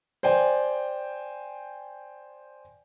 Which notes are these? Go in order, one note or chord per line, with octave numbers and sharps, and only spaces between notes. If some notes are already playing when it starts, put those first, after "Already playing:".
C5 D5 G5 G#5